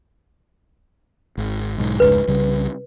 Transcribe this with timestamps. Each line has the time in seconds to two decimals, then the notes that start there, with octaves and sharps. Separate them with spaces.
1.37 G#1
1.78 B1 G#2
2.00 F1 C#2 G#2 B4
2.28 C2 C#3 G3